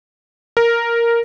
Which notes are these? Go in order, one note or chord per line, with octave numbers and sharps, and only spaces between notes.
A#4